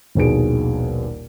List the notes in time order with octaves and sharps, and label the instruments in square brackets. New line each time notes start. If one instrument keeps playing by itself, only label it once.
[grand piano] D#1 A#1 D#2 B2 G#4 D7